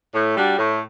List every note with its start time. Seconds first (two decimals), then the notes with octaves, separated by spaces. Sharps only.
0.14 A2
0.35 G3 D4 F#4
0.57 A2